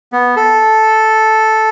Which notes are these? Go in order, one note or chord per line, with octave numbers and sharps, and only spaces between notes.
B3
A4